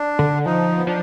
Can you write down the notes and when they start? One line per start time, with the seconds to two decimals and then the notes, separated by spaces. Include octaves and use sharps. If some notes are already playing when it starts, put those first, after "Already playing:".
Already playing: D4
0.19 D3
0.46 F3 D#4
0.77 B3
0.87 F3 D4